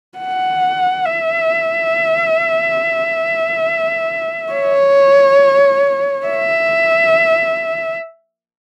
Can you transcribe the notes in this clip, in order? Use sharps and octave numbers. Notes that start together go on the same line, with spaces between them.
F#5
E5
C#5
E5